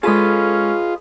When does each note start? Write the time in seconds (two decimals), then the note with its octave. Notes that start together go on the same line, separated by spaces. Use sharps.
0.03 G#3 C#4 F4 G#4 A4 B4 D#5